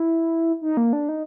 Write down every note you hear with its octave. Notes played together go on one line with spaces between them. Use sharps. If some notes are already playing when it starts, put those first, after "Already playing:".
Already playing: E4
D#4
A#3
D4
D#4